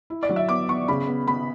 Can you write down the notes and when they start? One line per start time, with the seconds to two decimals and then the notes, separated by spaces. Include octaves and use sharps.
0.10 E4
0.23 D5
0.29 F#3
0.36 E5
0.49 B3 D6
0.69 B3 C#6
0.88 C#3 B5
1.08 B3
1.27 B3 B5